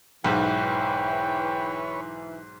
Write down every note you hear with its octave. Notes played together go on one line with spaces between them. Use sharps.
B1 G#2 E3 B4 C#5 G5